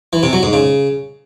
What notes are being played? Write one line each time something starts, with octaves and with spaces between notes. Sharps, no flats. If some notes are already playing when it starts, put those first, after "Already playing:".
E3
C3
F#3
G#2
C#3